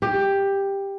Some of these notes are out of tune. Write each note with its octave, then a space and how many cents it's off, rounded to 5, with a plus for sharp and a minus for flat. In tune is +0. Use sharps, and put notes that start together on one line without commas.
G4 +10